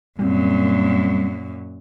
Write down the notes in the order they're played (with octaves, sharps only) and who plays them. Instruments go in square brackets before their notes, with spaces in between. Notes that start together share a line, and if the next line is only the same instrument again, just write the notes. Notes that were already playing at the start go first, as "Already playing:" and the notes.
[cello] F#2 A#2 [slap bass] G3 C4